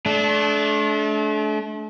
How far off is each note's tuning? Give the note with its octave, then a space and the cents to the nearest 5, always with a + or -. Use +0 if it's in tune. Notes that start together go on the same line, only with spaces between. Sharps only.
A3 -40 D4 -20